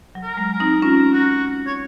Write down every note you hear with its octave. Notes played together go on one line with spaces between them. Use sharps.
F#3
A#4
G#3
A#4
C4 D#4
C#4 F4 A#4
F#4
C#5